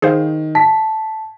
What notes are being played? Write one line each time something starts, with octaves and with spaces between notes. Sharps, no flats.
D#3 G#4 C5 F5
A5 B6